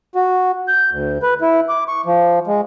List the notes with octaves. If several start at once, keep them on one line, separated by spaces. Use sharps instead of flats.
F#4
G6
D2
B4
E4
D6
C#6
F3
G#3